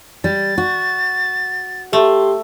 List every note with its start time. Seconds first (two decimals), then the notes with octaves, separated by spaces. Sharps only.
0.24 G3 A6
0.58 F#4
1.93 A3 G4 C6